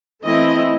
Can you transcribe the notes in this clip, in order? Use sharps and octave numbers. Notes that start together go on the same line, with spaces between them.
E3 A3 C4 E4 D#5